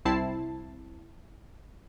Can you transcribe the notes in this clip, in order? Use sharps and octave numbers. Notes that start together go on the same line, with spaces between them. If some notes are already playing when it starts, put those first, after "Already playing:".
C2 C4 E4 A5 C7